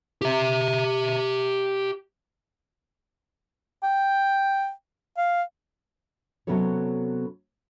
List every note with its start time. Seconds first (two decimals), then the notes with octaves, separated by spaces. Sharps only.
0.22 G4 E5
3.84 G5
5.17 F5
6.47 C3 F#3 B3 C#4 A4 C#5